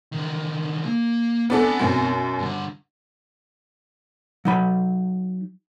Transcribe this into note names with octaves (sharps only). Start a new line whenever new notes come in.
D3 D#3
A#3
B3 C4 D4 A4 G#5
F#2 B2
G2 D3
F#3 D#4 B5